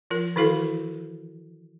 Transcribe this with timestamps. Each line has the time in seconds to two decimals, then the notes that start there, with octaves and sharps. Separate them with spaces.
0.11 F3 F4 A#4
0.36 D#3 E3 E4 F#4 A4 F5